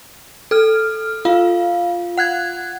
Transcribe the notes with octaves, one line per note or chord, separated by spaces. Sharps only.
A4 F6
F4 F5
F#5 F#6 G#6